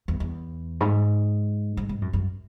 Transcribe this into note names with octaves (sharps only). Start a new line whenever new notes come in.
E2
E2
G#2
G#2
G#2
F#2
F#2